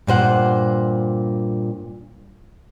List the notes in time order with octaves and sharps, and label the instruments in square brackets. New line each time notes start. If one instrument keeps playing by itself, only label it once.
[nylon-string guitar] G2 A#2 C5 F#5